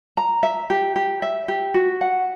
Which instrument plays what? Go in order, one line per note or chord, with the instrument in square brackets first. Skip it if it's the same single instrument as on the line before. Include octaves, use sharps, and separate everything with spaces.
[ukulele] A#5
E5
G4
G4
E5
G4
F#4
F#5